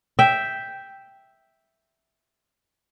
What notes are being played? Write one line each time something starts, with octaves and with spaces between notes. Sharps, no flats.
E5 G5